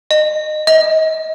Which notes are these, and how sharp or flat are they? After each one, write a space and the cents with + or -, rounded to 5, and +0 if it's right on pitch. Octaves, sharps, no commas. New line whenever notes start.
D#5 -25
D#5 +35